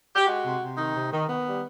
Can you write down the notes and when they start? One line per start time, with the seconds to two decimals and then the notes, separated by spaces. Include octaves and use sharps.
0.16 G4
0.27 G#3 F#4
0.45 C3
0.61 C3
0.78 D#3 D#4
0.95 C3
1.12 D#3
1.28 D#3 B3
1.46 G3